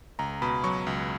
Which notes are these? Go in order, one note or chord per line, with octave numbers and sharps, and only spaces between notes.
C#2 A#5
B2 B5
F#3 C#6
C#2